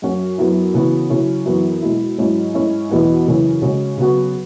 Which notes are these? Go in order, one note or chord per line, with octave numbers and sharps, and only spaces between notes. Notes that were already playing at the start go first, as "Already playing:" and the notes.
F#2 F#3 C#4 F#4
F#2 F#3 B3 E4
C#3 E3 B3 F#4
C#3 F#3 C#4 E4
F#2 E3 B3 F#4
B2 G#3 E4
G#2 F#3 C#4 E4
G#2 G#3 C#4 E4
E2 B2 B3 E4
F#2 C#3 E3 C#4
C#3 G#3 C#4 F#4
C#3 F#3 B3 F#4